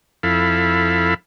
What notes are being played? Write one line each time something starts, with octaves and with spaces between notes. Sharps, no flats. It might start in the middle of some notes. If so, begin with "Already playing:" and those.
F2 E4 A4 F5 B5